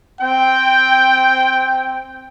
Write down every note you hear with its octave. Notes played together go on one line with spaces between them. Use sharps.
C4 G5